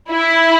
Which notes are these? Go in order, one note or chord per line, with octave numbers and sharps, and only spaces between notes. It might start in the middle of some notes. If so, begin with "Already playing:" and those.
E4